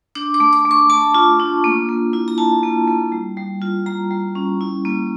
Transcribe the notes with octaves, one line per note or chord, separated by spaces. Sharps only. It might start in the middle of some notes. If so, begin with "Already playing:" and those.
D4 D6
D6
A3
D6
A3
C#6
A3 A5
F4
D4
A#3
A#3
E4
A#5
E4 A5
A#3
A#3
G3
G3
F4
G3 A#5
G3
C#4
E4
A#3